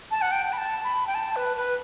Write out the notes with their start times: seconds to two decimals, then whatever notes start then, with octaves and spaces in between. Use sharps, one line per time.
0.11 A5
0.22 F#5
0.32 G5
0.46 G5
0.53 B5
0.58 A5
0.84 B5
1.07 G5
1.15 A5
1.36 B4
1.57 B4